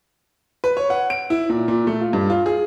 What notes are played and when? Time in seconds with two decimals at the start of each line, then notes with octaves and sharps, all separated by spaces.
0.64 B4
0.77 C#5
0.90 F#5
1.10 D7
1.30 E4
1.50 A#2
1.68 A#2
1.87 A3
2.01 F4
2.13 G2
2.30 F4
2.46 G#4